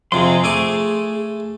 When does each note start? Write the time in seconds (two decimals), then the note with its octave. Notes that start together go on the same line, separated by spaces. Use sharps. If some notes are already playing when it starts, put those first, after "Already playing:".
0.12 F2 C3 G#4 C6
0.44 A3 G#5 D6